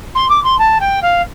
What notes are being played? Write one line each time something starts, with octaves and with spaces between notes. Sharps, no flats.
C6
D6
C6
A5
G5
F5